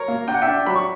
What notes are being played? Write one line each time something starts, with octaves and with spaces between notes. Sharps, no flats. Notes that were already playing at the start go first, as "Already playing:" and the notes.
Already playing: A#4 C#5
A#3
D4 G5
F#5
D4 E5 G5
F#3 B5
C#6